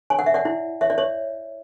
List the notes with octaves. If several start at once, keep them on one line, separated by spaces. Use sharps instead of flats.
C#5 G#5
F#5
E5
D5 F#5
E4
C#5 E5
D5
C#5